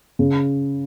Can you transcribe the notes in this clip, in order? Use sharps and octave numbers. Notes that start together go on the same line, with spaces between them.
C#3